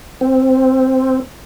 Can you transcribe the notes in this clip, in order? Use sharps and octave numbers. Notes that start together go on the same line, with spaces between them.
C4